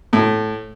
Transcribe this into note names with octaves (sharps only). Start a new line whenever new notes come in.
A2